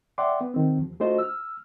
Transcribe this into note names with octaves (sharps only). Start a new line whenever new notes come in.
D5 E5 F#5 G5 C6 D6
B3
C3 D#3 C4
D#2 F3
A3 D4 F4 F#4 C5 D#5
E6 F6